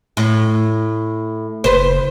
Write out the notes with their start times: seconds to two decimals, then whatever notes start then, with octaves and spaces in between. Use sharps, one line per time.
0.17 A2
1.64 F#1 B4 C5